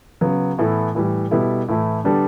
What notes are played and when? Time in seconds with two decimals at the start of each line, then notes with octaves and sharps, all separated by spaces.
0.21 C#3 F#3 B3
0.58 A2 E3 B3 E4 A4
0.95 A2 E3 G3
1.31 B2 G3 B3 E4 A4
1.68 A2 E3 A3 E4
2.04 D3 G3 B3 D4 A4